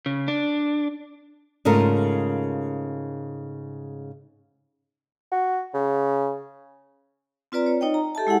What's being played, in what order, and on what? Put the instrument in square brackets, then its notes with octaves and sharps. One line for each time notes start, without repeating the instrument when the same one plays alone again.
[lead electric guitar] C#3
D4
[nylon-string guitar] G#2 C#3 A3 F4 A#4
[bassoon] F#4
C#3
[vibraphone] C4 F4 B4 D5 A#5
C#5
D#4 C#5 D#5 G5
A#5
G4 A4 E5 A5
G#3 E4 G#4 F#5